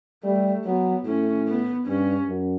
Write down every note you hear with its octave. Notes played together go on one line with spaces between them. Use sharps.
G3 A3
F#3 B3
A2 C#4
B3
G2 C#4
F#2